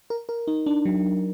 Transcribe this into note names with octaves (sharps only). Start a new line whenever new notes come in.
A#4
A#4
D#4
D4
F#3